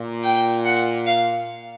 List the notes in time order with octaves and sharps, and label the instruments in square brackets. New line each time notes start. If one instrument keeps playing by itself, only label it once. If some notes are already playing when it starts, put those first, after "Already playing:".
Already playing: [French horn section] A#2
[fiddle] G5
F#5
F5